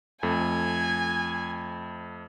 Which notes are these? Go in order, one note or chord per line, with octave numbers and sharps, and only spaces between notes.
F2 A3 G#5